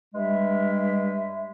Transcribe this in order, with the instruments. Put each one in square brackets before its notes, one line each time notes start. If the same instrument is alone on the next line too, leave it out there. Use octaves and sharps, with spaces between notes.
[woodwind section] G2 G3 G#3 E5